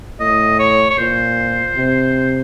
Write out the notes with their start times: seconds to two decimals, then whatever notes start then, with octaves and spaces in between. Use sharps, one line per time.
0.20 A2 D#5
0.59 C#5
0.91 C#5
0.98 A#2 C5
1.77 C3